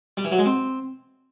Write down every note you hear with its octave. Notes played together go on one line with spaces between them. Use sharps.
G3
E3
F#3
G#3
C4